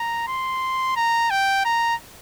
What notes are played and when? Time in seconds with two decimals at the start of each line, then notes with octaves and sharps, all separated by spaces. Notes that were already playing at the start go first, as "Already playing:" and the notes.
Already playing: A#5
0.28 C6
0.96 A#5
1.31 G5
1.65 A#5